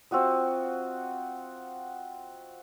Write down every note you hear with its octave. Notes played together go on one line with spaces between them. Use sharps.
C4 F4 F#4 D#5